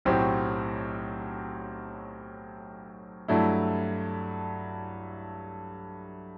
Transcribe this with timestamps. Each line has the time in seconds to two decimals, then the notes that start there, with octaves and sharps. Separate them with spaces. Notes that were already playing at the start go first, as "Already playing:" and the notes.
0.05 B1 A2 F#3 C4 G4
3.28 G2 F#3 A3 E4